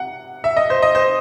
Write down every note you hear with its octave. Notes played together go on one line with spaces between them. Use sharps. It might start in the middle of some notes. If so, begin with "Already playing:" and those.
Already playing: C3 F#5
E5
D#5
C5
D#5
C5